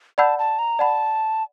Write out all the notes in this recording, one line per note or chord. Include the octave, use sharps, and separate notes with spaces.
D5 F#5 A5 B5 E6 G6
A5
A#5
D5 F#5 A5 B5